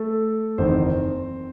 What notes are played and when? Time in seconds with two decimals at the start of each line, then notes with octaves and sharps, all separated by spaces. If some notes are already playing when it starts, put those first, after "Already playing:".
Already playing: A3 A4
0.58 F#1 E2 D#3 C4 C5